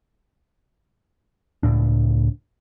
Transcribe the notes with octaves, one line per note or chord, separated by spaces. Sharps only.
C#2 A2 D4